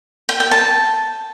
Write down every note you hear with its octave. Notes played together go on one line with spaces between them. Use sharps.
G5
G5
A5